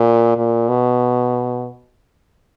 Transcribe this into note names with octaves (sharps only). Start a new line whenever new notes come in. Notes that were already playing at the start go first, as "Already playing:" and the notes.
Already playing: A#2
A#2
B2